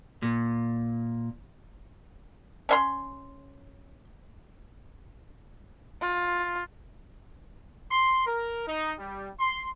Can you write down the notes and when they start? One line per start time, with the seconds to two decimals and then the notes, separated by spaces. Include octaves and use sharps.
0.23 A#2
2.69 C#4 E5 C6
6.01 F4
7.92 C6
8.27 A#4
8.68 D#4
8.99 G3
9.39 C6